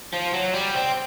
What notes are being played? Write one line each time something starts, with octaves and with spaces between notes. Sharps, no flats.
F3
F#3
G3
C4